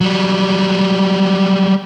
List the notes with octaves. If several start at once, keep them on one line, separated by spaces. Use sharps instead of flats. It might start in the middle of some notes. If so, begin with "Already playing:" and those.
F#3 G3